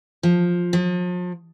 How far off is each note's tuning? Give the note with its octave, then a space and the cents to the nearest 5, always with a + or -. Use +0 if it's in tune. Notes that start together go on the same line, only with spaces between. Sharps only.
F3 +10
F3 +40